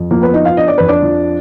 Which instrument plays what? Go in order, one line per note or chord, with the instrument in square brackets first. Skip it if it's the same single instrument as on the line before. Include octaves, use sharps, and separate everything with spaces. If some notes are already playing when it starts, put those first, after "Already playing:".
Already playing: [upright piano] F2
F3 A#3 A#4
B3 B4
B3 D#4 D#5
F4 F5
D4 D#5
D5
F2 B4
D4 D5
F3